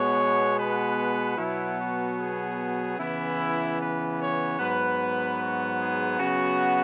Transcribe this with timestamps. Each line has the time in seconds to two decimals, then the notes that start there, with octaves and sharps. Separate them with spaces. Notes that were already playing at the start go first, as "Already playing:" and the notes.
Already playing: B2 G#3 B3 C#5
0.58 B4
1.38 B2 F#3 B3 E4
1.78 F#4
2.18 G#4
2.98 C#3 E3 B3 E4
3.79 B4
4.19 C#5
4.59 G#2 F#3 B3 B4
5.40 F#4
5.80 G#4
6.20 C#3 F#3 B3 F#4